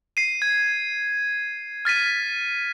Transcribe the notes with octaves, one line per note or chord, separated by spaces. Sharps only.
C7 D#7
G#6
F6 A6 B6 D#7